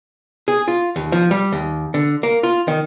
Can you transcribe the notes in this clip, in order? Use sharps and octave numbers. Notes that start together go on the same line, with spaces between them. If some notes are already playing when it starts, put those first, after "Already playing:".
G#4
F4
D#2
F3
G3
D#2
D3
A#3
F4
D#3